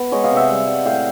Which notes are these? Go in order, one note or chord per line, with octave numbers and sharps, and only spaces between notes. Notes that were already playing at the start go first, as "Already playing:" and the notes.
Already playing: B3 B4
G#3 C#5 D#5
D#5 F5
C3
E5 F#5
G3
G3
A2 F5 G5